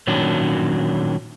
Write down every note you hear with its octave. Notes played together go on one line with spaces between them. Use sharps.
A#2 D#3 F#3 C#4 D4